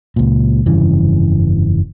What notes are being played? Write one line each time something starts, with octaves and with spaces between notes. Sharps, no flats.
C#2 A#2
F1 G2 C#3 E3